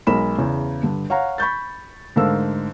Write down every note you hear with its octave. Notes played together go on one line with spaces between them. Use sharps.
B1 G#3 A#4 B5 E7
E2 C#3
G2 D3
C#5 F5 F#5 A#5
B5 C#6 G6 A6
G#2 D3 A3 A#4 F5 E6